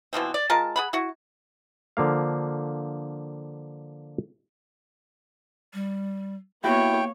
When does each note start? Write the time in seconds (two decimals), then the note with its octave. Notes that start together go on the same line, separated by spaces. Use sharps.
0.13 B2 E3 F3 C4
0.34 D5
0.50 G#3 F4 A#4 A5
0.76 G#4 F#5 B5
0.93 E4 F#4
1.97 D3 F3 A#3 F5
5.74 G3
6.64 A#3 B3 E4 F#4 G4 C#5 G5